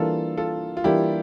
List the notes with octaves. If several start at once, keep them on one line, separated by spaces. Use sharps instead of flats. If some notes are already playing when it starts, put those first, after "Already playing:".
Already playing: E3 G3 A#3 D4 F4 A4
F4 A4
F4
E3 G3 A#3 D4 E4 G4